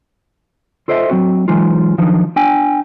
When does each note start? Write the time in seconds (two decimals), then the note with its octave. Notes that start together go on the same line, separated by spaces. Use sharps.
0.88 F4 A4 C5 D#5 E5
1.10 F#3 C4 F#4
1.48 E3 F#3 G#3 D#4 F4
1.98 D#3 F3 F#3 D4 D#4
2.36 D4 G5 G#5